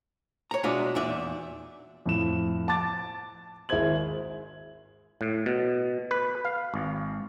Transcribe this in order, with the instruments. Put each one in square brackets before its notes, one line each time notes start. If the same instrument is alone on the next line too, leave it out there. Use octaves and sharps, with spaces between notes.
[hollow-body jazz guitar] C#5 A#5
B2 G#3 D4 F4 D#5 E5
E2 A#2 D#4 D5 E5
[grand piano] F2 A2 E7
A5 D6 A6
G#1 E4 G#4 C5 G#6 F#7
[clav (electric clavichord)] A2
B2
B4
F5
G#1